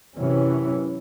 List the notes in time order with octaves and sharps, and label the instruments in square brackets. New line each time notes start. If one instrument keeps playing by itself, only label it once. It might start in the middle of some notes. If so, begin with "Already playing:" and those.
[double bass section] F#2 C3 E3 F#3 C#4